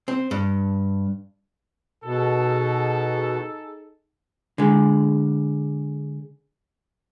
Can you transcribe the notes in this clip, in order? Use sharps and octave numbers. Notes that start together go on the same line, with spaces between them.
C4
G2
B2 D#4 G#4 A4
D3 G#3